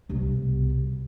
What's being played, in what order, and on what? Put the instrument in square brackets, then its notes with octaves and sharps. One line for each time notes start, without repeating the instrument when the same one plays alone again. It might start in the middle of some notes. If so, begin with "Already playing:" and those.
[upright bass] C2 B2